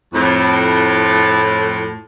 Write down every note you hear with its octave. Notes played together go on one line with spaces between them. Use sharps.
F2 A2